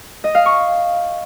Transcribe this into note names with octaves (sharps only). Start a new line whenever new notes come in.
D#5
F5
C#6